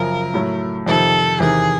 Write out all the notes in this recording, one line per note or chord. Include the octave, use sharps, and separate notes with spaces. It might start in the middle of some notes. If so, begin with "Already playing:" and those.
Already playing: F#2 C#3 F3 A#4
A2 F#3 A3
F2 C3 D#3 A4
E2 C3 D#3 G#4